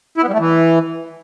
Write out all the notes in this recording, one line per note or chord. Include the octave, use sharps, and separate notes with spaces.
E4
B3
G3
A3
E3